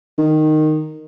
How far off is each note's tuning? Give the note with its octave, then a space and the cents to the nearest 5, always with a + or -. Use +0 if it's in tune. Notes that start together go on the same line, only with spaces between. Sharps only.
D#3 -10